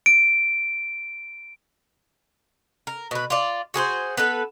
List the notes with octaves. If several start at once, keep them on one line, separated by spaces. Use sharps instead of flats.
D7
A#4
B2 B4
F4 D5
F#4 G#4 B4 C5
B3 A4 B4